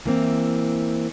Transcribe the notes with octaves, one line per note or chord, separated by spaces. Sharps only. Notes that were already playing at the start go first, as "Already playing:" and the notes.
E3 A#3 C4